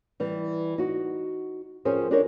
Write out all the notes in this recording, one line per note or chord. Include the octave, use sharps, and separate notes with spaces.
E3 G3
D#4 F#4
F3 C#4 G4 G#4 A#4 C5
D4 D#4 G4 A#4 C#5